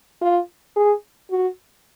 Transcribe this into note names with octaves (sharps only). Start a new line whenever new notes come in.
F4
G#4
F#4